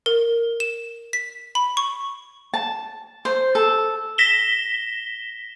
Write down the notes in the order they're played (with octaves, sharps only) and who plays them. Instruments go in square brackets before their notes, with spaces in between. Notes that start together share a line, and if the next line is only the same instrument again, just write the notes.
[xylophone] A#4
E7
B6
B5
C#6
[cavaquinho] A5
C5
A4
[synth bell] A#6 B6 E7 G7